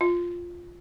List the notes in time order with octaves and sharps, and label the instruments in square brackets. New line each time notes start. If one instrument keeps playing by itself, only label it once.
[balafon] F4